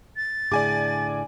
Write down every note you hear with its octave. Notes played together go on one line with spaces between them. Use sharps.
A6
A2 D3 G#4 D5 G#5 D6